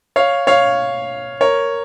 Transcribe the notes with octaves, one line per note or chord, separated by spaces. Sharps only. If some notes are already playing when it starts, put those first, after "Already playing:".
C#5 F5
C#5 F5
A#4 C#5